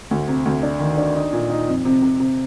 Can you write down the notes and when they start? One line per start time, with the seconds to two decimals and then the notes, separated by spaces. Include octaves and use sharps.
0.11 D2
0.28 C3
0.45 D2
0.63 D4
0.80 D#3
0.98 D4
1.15 D#4
1.33 A#2
1.50 D#4
1.68 F2
1.85 C3
2.02 C3
2.20 C3